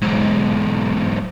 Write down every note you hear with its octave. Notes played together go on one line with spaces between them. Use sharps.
B1 G#2